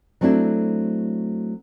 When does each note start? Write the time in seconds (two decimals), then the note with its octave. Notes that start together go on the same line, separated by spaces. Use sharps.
0.21 F#3 A3 C4 D4 E4